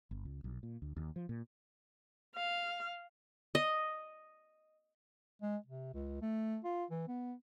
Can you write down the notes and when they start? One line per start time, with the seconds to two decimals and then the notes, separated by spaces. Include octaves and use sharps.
0.11 G1
0.25 C#2
0.44 B1
0.63 A#2
0.82 D2
0.96 D#2
1.16 F3
1.29 A#2
2.36 F5
3.55 D#5
5.42 G#3
5.66 C3
5.94 C#2
6.22 A3
6.65 F4
6.91 E3
7.08 B3